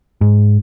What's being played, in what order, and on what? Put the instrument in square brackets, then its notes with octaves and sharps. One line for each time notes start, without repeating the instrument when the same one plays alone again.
[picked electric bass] G#2